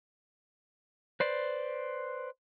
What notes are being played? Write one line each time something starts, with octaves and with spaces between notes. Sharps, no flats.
B4 C5 D5